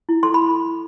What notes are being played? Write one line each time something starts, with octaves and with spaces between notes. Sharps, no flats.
E4
A4 C6
B5